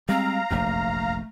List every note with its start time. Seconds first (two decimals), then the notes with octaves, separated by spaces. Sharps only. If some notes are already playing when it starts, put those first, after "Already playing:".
0.09 G3 G#3 C4 F5 A#5
0.51 F1 A#1 F#2 A3